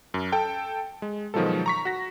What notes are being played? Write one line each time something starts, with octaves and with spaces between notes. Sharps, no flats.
F#2
A4 G5 A5
G#3
B2 D#3 F3 F#3 G#3 A4
A#5 C#6 B6
F#4 A#6